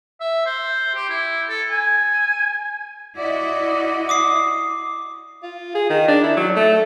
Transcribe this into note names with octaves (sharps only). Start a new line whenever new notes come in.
E5
C5
G4
E4
A4
G#5
E4 F#4 D5 D#5
D6 D#6 C7
F4
G#4
D#3
D4
E4
F#3
A3